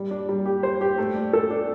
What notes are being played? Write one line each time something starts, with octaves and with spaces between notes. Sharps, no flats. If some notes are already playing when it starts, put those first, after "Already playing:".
Already playing: G3
D4
G3
G4
C5
G4
A3
D4
A4
D4